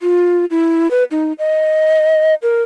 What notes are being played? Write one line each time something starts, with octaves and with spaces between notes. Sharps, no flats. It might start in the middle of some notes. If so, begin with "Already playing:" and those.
F4
E4
B4
D#4
D#5
A#4